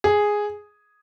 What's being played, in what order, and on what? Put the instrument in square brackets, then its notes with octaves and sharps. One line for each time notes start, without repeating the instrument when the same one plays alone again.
[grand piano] G#4